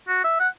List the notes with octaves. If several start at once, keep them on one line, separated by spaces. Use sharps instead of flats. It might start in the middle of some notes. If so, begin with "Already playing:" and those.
F#4
E5
F#5